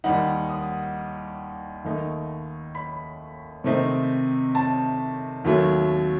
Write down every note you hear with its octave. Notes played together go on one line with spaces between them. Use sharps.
D#2 D#3 G3 D#4 F#5
D#6
D#2 D#3 A3 D#4
B5
C3 D#3 A3 C4 D#4
A5
D#2 D#3 F#3 A3